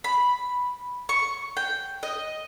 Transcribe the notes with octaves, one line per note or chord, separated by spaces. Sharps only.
B5
C#6
G5
D#5